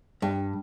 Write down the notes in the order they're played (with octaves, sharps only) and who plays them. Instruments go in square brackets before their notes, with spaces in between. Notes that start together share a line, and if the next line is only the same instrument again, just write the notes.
[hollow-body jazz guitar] G2